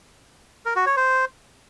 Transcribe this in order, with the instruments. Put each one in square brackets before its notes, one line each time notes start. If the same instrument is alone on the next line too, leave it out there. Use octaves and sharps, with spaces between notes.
[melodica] A#4
F#4
C#5
C5